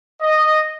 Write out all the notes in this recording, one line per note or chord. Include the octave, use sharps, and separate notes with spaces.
D#5